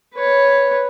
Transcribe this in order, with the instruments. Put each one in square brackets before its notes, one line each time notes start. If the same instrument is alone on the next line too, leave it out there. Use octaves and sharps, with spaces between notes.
[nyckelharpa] B4 C#5